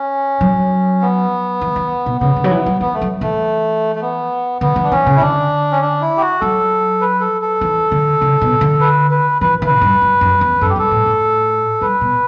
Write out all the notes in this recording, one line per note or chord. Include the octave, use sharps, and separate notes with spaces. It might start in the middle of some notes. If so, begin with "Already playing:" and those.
Already playing: C#4
F#3
B3
E3
E3
B2
C#3 B3
D3
F#3
E3
F#3
E3 B3
A3
F#3
E3 A3
A3
B3
D3 B3
E3
D4
E3 C#4
C#3
E4
D3 D4
C#4
D4
E4
G4
F#4
F#3 A4
B4
A4
A4
E3
D3
C#3
B2
D3
B4
B4
E3 B4
E3 B4
A2
G2
F#2
F#2
E2
F#2 A4
G4
G2 A4
A2
A2
G2 B4
B2